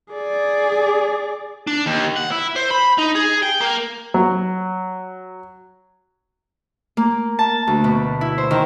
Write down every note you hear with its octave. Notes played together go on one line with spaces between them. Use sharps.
G#4 D5
D4
D#2
F#5
E4
C5
B5
D#4
G#4
G5
A#3
F#3
A#3
A5
D2
B2
E4
C5
D#3